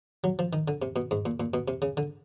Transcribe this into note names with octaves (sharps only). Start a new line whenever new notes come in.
F#3
F3
D#3
D3
C3
B2
G#2
A#2
A#2
B2
C3
C#3
D3